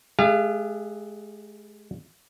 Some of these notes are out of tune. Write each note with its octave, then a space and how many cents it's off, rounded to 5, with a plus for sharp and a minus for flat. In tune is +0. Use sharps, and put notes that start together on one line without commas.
G#3 +35 G#4 -45 F5 -25